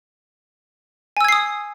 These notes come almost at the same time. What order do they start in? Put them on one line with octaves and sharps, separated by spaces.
G#5 E6 G#6 C7 D#6